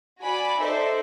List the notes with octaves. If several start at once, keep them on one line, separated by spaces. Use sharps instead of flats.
F#4 D5 G#5 B5
D#4 A4 C5 D5 E5